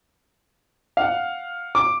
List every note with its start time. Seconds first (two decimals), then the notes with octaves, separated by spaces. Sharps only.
0.97 F5 F#5
1.75 D6